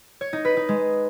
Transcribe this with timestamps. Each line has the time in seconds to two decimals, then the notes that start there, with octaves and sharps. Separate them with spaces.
0.21 C#5
0.33 D#4
0.45 B4
0.57 D#4
0.69 G#3